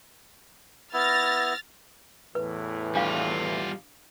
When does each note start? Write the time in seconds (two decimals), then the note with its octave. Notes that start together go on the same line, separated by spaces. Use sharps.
0.93 B3 E4 F6 A6 A#6
2.35 E2 A2 E3 B4
2.95 G3 D4 F4 F5